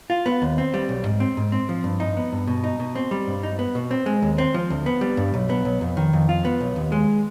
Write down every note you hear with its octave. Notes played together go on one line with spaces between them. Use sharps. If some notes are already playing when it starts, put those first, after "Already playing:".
F4
B3
D#2
C4
G3
B1
G#2
C4
G#2
C4
F3
G2
D#4
B3
G2
B2
D#4
B2
C4
G3
G2
D#4
B3
B2
C4
G#3
D#2
C4
F3
D2
B3
G3
G2
B1
B3
B1
F2
D#3
F2
F4
B3
B1
D#2
G#3